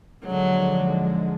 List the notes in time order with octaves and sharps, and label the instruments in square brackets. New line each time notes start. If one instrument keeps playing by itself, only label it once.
[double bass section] D#2 D3 F3 G#3 [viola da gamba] F#3